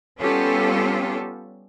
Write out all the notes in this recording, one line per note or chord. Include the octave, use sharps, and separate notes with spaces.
G3 B3 C#4 F4 G4 A4